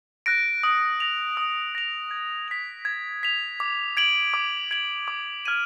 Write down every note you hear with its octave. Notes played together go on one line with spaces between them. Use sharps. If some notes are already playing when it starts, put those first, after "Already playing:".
F#6 A#6 D7
D#6
A#6 F7
D#6
A#6 F7
G#6
B6 F7
G#6
B6 F7
D6
G#6 D7 F#7
D6
G#6 D7 F#7
D6
F6 G#6 D#7